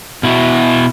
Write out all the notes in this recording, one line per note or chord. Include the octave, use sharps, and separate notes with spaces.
B2 E4 F#4